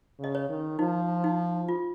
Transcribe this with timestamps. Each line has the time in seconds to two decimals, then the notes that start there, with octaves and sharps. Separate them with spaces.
0.19 C#3 D#5
0.35 C#5
0.49 D#3
0.79 F3 D#4
1.24 D#4
1.69 F4